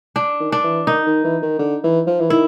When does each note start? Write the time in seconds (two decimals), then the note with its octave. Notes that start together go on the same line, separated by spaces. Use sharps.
0.16 D4
0.40 D#3
0.52 D4
0.63 E3
0.87 D#3 D#4
1.06 D#3
1.24 E3
1.42 D#3
1.59 D3
1.84 E3
2.07 F3
2.20 E3
2.30 D#3 E4